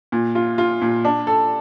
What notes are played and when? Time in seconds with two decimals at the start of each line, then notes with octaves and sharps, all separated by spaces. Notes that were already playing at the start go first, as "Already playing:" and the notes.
0.12 A#2
0.35 F4
0.58 F4
0.82 A#2
1.05 D4
1.27 A4